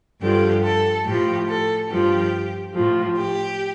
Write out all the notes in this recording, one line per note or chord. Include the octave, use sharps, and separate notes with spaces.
G2 D3 F3 G4
A4
A2 F3 G4
A4
G2 F3 G4
A2 F3
G4